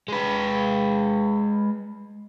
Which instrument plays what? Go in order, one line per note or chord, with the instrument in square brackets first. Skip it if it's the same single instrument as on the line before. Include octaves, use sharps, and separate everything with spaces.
[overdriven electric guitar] G#3 B4